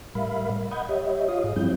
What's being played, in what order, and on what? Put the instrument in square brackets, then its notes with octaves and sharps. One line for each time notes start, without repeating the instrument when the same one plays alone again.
[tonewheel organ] A2 G3 A#4 E5 F5 B5
D#5 F#5 B5 D#6 G6 G#6
G4 C#5 D#5 E5
F4 C#5 F5 D#6
G#2 G#4
G2 F3 G3 C4 E4 G6